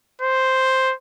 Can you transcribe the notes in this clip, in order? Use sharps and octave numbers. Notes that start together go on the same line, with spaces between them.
C5